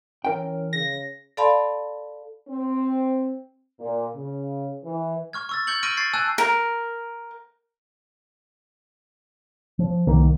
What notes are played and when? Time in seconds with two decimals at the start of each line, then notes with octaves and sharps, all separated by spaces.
0.25 E3 C#4 A#4 G5
0.73 C#3 A#6
1.37 A4 D5 F5 A5 B5 C6
2.47 C4
3.79 A#2
4.15 C#3
4.84 E3
5.33 C#6 F6 G#6
5.49 C#6 E6 A6
5.67 C#6 G6 G#6 C#7 F#7
5.83 C#6 F6 A#6 D7 D#7 F#7
5.97 C#6 G#6 A6 C7 D7
6.13 G#5 A5 E6 F#6 G#6 D#7
6.38 A#4
9.79 F3
10.07 C2 D#3 A#3